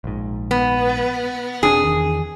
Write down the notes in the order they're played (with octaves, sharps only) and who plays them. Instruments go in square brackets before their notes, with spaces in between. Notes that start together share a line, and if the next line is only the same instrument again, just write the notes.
[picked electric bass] A#1 G#2
[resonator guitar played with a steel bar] B3
[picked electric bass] E1 C4 D4 [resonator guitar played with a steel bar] G#4
[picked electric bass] E2 D#3